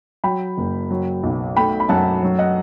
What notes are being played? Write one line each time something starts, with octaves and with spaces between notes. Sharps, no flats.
F#3 G5 B5
F#1
F#3
B1
A3 G5 B5
B5
F#2 F#5 A5
F#3
D#5 F#5